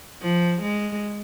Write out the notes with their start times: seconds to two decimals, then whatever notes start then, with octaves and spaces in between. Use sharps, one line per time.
0.22 F3
0.62 G#3